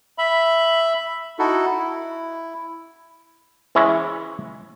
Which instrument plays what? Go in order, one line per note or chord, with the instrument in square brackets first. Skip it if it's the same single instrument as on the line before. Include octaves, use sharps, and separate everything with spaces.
[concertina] E5 B5
D#4 E4 F#4 A4
E4
[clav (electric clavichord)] E3 G#3 C#4 E4 C#5